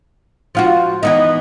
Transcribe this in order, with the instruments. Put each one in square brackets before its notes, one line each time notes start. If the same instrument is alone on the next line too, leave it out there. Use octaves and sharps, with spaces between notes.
[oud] F3 F4 F#4
[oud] E3 B3 D#4 [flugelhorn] D#5